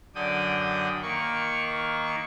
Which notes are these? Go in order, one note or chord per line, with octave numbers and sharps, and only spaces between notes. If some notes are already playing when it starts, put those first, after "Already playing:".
F#2 D3 D5 G5 D#6
D#3 A#3 C#6